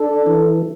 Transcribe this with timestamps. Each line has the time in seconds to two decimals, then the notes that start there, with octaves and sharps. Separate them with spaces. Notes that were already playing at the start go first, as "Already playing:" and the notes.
Already playing: D4 A4
0.26 E3